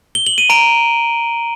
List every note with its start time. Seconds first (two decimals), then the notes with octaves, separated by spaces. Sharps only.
0.15 G7
0.27 F#7
0.38 D#7
0.50 A#5 D7